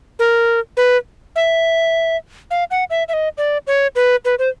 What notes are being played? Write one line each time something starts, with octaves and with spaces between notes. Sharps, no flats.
A#4
B4
E5
F5
F#5
E5
E5
D#5
D5
C#5
B4
B4
C5